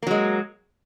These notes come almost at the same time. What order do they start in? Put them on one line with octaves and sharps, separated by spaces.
A#3 F#3 G#3